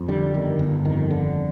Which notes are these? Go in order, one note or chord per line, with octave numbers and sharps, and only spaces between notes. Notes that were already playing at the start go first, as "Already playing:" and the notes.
Already playing: F2
D3 G3
G1 D#3
G1
F2 D#3
D3